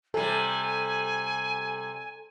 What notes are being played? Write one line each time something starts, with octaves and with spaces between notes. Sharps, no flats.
C3 G3 A4 G#5